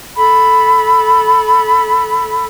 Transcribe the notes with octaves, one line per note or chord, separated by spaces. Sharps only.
A4 B5